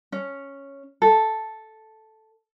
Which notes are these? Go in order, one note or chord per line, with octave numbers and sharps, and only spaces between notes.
C#4
A4